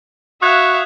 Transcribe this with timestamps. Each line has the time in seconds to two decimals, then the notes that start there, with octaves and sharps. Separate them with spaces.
0.42 F#4 E5 F5 D#6 F#6 G#6